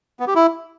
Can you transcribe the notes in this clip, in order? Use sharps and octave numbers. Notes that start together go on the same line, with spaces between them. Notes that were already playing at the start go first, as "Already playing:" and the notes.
B3
G4
E4